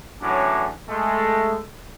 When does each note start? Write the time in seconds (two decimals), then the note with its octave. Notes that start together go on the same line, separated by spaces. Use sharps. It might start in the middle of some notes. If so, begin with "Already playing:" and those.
0.22 E2 A2 F#3 C#4 D4
0.89 G#3 A3